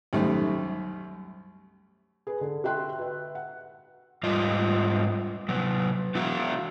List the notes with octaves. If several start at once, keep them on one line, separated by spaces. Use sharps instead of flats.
C2 F#2 D#3 G3 A3
G#4 B4
D3
F#4 E5 G5 C6 F#6
B4 E5
F#5
G#2 G3 F4 D#5
C3 F#3
B3 E4 F#4